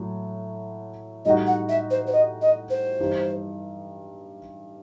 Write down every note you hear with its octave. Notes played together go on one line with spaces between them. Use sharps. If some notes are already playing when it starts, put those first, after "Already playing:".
Already playing: A2 F#3 A3
A2 G3 D#4 F#4 D#5
F#5
E5
C5
C5
D#5
D#5
C5
G2 E3 G3 D#4